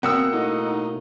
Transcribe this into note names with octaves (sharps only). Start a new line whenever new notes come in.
B2 A#3 C4 F#5 D#6 E6
A2 D#4